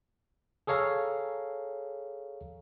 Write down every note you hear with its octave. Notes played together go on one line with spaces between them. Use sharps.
G#4 A4 C#5 F5 A#5